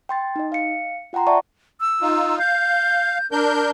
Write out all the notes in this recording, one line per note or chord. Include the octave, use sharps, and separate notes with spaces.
G5 C6 A6
D#4 D#5
F5 C#7
F4 F#5 G5 A#5 C6
D5 E5 F#5 A5 A#5 C#6
E6
D#4 F4
F5 G6
D4 A#4 G6